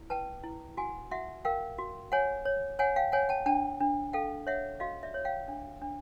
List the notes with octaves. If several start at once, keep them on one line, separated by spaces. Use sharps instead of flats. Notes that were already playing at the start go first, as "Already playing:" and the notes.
Already playing: E4
B4 G5 A5
E4
F#4 F#5 G#5
F#4 E5 F#5
A#4 F5 G5
F#4
C#5 F#5 G#5
C#5
C#5 F#5 G#5
F5 G5
C#5 F#5 G#5
G5 A5
D4 G5 A5
D4
A4 F5 G5
C#5 E5 F#5
F#4 D#5 F5
D5 E5
C#5
F5 G5
D4
D4